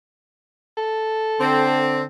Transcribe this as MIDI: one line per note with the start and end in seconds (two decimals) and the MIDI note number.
0.77 1.83 69
1.40 2.02 50
1.40 2.02 60